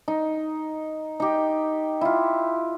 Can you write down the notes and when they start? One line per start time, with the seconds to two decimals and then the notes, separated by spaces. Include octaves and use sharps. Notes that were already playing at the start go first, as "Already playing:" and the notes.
0.08 D#4
1.20 D#4 G4
2.01 E4 F4